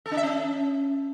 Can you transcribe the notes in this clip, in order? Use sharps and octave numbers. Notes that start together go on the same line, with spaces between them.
A4
D4
E5
C#4